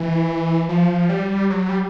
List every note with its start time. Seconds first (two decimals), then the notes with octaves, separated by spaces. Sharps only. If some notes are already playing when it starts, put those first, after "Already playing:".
Already playing: E3
0.69 F3
1.09 G3
1.50 F#3
1.69 G3